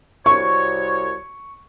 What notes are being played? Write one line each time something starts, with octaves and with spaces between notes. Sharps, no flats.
C2 F#4 C#5 C#6